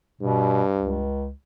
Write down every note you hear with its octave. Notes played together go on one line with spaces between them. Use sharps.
G2 B2
C#2